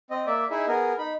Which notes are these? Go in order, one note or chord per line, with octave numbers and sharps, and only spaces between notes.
C4 D#5
A#3 D5 E5
D#4 E4 G#4 E5
B3 G#4 A#4
D#4 B5